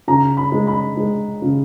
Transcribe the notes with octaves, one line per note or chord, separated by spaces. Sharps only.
C#3 A#5
B5
G#3
B5
G#3
C#3